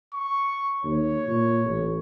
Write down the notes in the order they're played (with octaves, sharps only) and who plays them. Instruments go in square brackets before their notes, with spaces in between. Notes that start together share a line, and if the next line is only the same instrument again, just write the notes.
[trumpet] C#6
[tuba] D#2 [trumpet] C#5
[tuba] A#2
A1